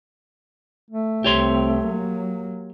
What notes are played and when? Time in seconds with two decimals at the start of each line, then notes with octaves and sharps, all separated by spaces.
0.90 A3
1.24 C2 C4 G4 C#5 C6
1.86 F#3 A#3